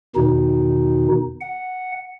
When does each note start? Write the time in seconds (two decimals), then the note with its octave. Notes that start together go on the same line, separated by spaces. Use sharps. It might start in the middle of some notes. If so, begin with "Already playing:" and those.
0.15 E2 B2 D#3 D#4
1.41 F#5